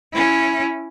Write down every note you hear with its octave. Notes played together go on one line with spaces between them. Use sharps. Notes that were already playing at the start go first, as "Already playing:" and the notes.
C#4 E4